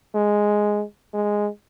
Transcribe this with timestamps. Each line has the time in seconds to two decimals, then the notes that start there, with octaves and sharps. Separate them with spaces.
0.15 G#3
1.14 G#3